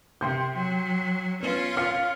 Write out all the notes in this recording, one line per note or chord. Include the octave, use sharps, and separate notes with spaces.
C3 G5 C6 G6
F#3
B3 C#4 F4
F5 F6 C#7